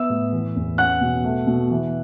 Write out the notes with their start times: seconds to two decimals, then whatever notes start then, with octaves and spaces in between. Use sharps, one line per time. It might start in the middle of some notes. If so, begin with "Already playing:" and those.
Already playing: B3 E5 E6
0.10 A2
0.33 E3
0.56 E2
0.78 C#4 F#5 F#6
1.01 B2
1.24 A3
1.47 B2
1.70 E3